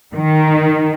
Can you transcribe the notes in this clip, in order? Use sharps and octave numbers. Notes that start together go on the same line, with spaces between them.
D#3